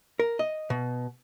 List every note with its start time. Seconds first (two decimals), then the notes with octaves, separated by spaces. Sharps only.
0.20 A#4
0.39 D#5
0.70 B2